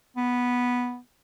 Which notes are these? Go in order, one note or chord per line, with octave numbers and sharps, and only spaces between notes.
B3